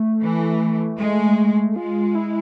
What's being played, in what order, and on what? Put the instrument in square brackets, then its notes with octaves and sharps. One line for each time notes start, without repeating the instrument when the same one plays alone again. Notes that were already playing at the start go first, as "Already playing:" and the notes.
Already playing: [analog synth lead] A3
[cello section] E3
G#3
[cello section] G#3 [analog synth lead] F4
[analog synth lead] E4